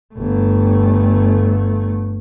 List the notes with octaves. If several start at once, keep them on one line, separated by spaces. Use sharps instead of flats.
G1 A3